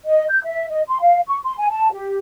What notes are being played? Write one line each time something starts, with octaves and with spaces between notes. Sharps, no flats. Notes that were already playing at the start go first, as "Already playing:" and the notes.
D#5
G6
E5
D#5
C6
F5
C#6
C6
G#5
A5
G4